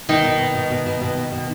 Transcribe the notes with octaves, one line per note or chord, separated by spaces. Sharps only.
B2 D#3 D#4
B2
B2
B2
B2
B2
B2
B2
B2